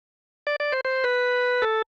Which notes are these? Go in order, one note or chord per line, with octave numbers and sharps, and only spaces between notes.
D5
D5
C5
C5
B4
A4